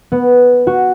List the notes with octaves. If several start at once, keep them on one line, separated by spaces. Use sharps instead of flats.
B3
F#4